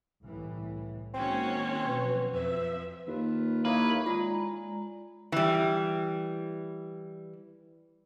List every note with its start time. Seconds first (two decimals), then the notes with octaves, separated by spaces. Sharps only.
0.23 C2 A2 E3
1.14 D#3 G#3 A#3 C4 C#4 F#4 C#5
1.86 B2 F3 F#3 B4
2.34 F2 F3 B4 E5
3.07 D#2 F4 B4
3.65 A#3 D#4 E4 B4 C#5 F5
4.06 G#3 F4 D5 A#5
5.32 E3 G3